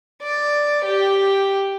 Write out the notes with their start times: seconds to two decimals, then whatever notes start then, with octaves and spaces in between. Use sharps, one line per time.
0.23 D5
0.85 G4